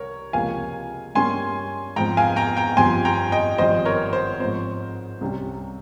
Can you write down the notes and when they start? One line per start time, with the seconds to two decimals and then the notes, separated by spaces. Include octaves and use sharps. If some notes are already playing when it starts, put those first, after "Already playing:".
Already playing: C2 A#4 C#5
0.33 C#2 C3 F3 A#3 F5 G#5
1.15 G2 G3 A#3 C#4 G#5 C6
1.96 G#2 F3 C4 G5 A#5
2.17 F5 G#5
2.36 G5 A#5
2.57 G5 A#5
2.77 G1 G2 F3 C4 G#5 C6
3.05 G5 A#5
3.32 D#5 G5
3.58 G#1 G2 F3 C4 C5 D#5
3.85 A#4 C#5
4.13 C5
4.39 G#2 F3 C4 C5
5.21 C2 C3 G3 C#4